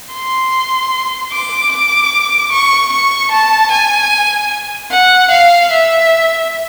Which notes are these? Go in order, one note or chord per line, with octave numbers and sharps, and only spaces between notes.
C6
D6
D6
C#6
C#6
A5
G#5
F#5
F5
E5